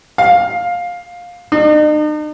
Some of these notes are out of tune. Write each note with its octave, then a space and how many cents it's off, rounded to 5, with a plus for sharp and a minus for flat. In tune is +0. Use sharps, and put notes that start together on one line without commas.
F5 +15
D#4 -45